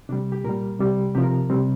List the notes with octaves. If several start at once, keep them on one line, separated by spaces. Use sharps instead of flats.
C3 G3 D4
G4
A#2 G3 A#4
C3 G3
C3 F3 G4
A#4
C3 G3 C4